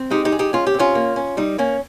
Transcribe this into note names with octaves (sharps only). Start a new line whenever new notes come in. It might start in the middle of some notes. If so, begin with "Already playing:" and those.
Already playing: C4
G#3 D#4 G4
D#4 G4
G#3
D#4 G4
C#4 F4
G4
C3
C#4 F4
A#3
C#4
G3 D#4
A#3 C#4